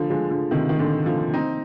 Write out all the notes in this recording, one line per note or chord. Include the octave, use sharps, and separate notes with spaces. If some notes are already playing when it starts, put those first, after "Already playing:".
Already playing: D3 F3
F3 G#3
D3 F3
C3 D#3
D#3
A#2 D3
D3 F3
C4 D#4